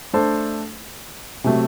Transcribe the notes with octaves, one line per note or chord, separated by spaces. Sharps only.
A3 D4 A4 C5
C3 F#3 A3